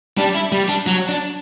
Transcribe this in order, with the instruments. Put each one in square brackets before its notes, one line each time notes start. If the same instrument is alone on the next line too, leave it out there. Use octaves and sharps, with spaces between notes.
[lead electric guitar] G3 [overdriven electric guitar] D4
[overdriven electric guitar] E4
[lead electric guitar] G3
[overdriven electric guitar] D4
[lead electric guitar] F#3
[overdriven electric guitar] D4